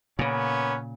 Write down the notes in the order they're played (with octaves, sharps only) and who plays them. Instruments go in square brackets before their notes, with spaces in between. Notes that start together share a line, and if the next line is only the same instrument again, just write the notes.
[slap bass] A#2 C#3 [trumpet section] A#3 B3 C#4